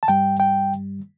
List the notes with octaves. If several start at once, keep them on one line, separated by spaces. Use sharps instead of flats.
A5
G2 G3 G5
G5